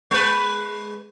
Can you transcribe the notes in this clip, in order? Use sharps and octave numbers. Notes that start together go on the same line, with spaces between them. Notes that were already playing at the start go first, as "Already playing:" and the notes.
G#3 B4